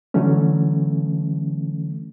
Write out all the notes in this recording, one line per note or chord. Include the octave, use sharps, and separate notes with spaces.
D3 E3 F#3 A3 C#4